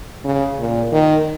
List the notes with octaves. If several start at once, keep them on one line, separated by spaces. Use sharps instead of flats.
C#3
A#2
D#3